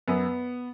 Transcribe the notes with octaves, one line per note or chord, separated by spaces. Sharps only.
F#2 B3